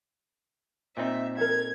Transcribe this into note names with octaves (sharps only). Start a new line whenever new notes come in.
A#2 C4 D#4 E5
A4 A#4 G#6